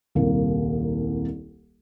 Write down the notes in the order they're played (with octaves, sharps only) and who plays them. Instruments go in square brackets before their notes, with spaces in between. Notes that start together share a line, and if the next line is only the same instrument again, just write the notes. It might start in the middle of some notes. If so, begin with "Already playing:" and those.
[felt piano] D#1 C2 A#3